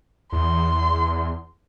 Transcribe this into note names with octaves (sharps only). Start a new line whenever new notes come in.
E2 C6